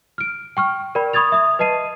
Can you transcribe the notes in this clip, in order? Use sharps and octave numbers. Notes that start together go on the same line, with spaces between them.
F6 D7
G5 C#6 F6
A#4 D5 G5 B5
B5 C#6 D#6 G#6 A6 F7
E5 D#6
B4 D#5 A5 C7 D#7